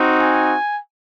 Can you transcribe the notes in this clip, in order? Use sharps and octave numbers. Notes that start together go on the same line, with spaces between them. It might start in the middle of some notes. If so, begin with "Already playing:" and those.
Already playing: C4 D#4 F#4
G#5